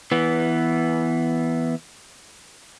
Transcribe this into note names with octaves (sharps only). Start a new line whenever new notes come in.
E3 B3